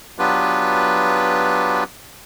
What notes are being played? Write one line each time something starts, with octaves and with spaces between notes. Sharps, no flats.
F#3 B3 D4 F4 G4 B4